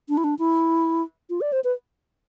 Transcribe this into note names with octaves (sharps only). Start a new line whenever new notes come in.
D4
E4
D4
E4
F4
D5
C5
B4